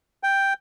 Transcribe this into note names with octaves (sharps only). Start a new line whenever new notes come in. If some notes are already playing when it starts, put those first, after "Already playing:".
G5